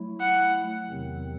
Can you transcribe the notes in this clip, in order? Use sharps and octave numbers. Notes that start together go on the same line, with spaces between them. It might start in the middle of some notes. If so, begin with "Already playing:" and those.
Already playing: F#3 A3 E4
F#5
E2 C3 D#3 F#3 C4